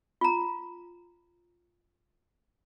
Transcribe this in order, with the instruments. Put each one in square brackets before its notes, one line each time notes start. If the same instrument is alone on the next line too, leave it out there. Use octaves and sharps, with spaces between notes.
[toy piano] F4 A#5